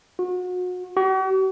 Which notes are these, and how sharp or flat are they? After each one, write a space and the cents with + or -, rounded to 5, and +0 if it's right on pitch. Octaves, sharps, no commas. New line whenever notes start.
F#4 -35
F#4 +45